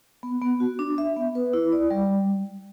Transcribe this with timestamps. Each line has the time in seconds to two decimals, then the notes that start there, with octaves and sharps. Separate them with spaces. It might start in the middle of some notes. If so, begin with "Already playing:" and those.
0.23 B3
0.41 B3
0.60 F#4
0.79 D4
0.98 E5
1.16 B3
1.35 B4
1.53 E4
1.72 D5
1.91 G3